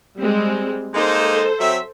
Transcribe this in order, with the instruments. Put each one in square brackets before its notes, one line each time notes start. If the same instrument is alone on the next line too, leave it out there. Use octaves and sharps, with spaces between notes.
[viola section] G3 G#3 C4
[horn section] G#3 A#3 D#4 [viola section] A4 C5
[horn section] F#3 C4 E5